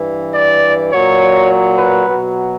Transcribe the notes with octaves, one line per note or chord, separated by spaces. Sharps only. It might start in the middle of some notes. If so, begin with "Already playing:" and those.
Already playing: G2 E3
D5
A#2 F#3 C#5
B4
B2 F#3